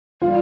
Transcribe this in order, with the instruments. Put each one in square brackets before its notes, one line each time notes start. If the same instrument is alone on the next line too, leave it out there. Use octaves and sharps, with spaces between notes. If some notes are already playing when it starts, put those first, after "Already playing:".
[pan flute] G3 [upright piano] F4